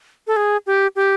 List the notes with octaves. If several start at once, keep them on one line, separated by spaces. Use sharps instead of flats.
A4
G#4
G4
G4